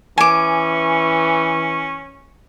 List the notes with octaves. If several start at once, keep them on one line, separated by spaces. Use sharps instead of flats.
E3 C#4 G#5 D6